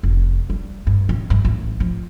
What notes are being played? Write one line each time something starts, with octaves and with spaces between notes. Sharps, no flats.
F1
G3
G2
A1
G2
A1
F3